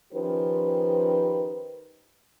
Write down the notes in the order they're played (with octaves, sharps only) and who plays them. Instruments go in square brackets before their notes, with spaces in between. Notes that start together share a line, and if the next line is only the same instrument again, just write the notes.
[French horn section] D#3 F3 C#4 G4 B4 C5